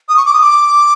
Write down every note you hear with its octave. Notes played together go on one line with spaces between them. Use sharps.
D#6
C#6
D6
D#6
D6